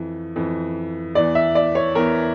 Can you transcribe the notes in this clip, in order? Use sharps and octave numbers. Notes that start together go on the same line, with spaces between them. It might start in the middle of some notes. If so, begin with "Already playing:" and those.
Already playing: F2 E3
F2 E3
E2 E3 D5
E5
D5
C#5
E2 E3 A#4